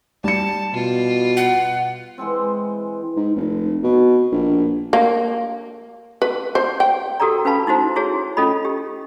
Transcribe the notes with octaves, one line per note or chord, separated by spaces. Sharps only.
G3 A5 C#7
B2 F4
F#5
E3 G#3 C4
G#2
F1
B2
A#1
A#3
B4
C5
G5
F#4 G4 A4 A#4 D5 A#5
C#4 B4 F5 A5 B5
D#4 E4 F#4 C5 A#5
E4 F#4 G#4 C#5
C#4 F4 A4 D#5 B5
G4